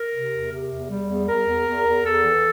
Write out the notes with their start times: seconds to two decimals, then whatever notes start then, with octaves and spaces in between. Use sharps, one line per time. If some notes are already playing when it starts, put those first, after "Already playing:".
Already playing: A#4
0.13 C3
0.32 E2
0.51 C3
0.71 E2
0.90 G3
1.09 E2
1.28 E2 A#4
1.47 E2
1.66 E2
1.86 E2
2.05 E2 A4
2.24 E3